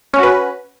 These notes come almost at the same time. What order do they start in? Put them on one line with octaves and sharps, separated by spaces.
C#4 F#4 B4